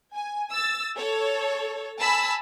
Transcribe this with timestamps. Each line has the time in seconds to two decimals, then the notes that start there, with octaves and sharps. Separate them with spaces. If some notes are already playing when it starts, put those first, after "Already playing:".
0.14 G#5
0.52 E6 A6
0.95 A4 C#5
1.99 G#5 A5 B5 E6